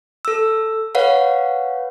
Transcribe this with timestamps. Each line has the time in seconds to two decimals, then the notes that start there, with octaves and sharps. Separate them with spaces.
0.25 A4 E6
0.95 B4 C#5 F5 F#5